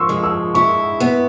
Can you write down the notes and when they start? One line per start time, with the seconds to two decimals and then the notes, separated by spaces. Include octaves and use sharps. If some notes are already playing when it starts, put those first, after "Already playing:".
Already playing: F3 C6 C#6 E6
0.09 G#3
0.24 E6
0.54 E4 C#6
1.00 B3